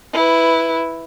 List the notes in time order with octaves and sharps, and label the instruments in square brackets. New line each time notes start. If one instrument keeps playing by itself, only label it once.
[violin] E4 B4